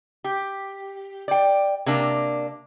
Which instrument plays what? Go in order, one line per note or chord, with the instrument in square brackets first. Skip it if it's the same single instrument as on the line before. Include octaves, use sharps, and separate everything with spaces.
[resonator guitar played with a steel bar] G4
D5 G5
C3 A#3 D4